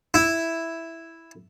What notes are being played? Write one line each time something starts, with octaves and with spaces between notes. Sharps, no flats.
E4